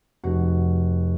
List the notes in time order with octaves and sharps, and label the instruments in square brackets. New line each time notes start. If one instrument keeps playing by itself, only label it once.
[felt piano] F1 F#4